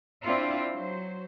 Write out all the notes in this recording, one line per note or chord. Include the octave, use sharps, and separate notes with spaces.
C4 D4 E4 F4
F#3 C5